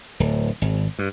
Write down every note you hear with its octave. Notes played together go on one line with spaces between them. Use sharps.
D1
G#1
G2